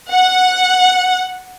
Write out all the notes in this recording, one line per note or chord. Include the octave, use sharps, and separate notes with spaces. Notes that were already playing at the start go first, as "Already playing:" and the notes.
F#5